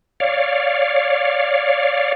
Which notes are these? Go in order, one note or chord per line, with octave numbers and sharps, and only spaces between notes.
C#5 D5 F5